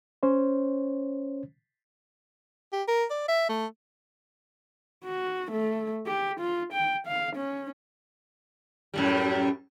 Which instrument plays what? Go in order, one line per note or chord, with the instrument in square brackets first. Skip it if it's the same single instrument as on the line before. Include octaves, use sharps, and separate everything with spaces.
[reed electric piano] C#4 C5 C#5
[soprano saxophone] G4
A#4
D5
E5
A3
[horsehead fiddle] F#4
A3
G4
F4
G5
F5
C#4
[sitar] F#2 A2 G3